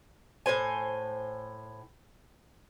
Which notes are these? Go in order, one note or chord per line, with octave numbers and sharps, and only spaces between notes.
A2 G3 C5 G#5